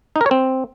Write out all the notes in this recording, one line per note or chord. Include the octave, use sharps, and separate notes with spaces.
D#4
A#4
C#5
C4